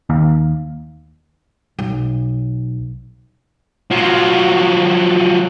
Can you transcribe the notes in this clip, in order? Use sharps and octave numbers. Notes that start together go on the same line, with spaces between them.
D#2
B1
F3 F#3